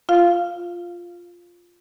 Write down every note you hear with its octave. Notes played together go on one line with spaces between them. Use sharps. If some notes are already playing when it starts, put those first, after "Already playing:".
F4 F5